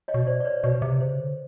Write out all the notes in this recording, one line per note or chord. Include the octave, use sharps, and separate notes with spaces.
C#5 D#5
B2
C5 D5
D5
B4 C#5
B2 B4 C#5
C3
C#3 C5
D3